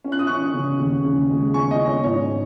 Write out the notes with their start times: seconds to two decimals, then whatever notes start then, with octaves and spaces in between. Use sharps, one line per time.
0.04 C#4
0.12 F#6
0.19 D#6
0.27 C#4 C#6 F#6
0.54 C#3
0.79 D#2
1.05 C#3
1.29 G#3
1.54 C#4 G#5 C#6
1.70 D#5 G#5
1.79 C#4
1.87 C#5
2.04 G#2 C#5